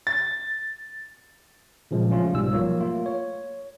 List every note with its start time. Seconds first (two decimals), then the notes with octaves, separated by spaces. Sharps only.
0.07 A6
1.91 A#2 C#3 F3 F#3 G#3
2.09 F3 A3 C#4 F4
2.33 C2 G#2 B2 G3 F4 E6
2.53 F3 F#3 A#3 F4 C#5
2.80 A3 A#3 F4
3.06 C#5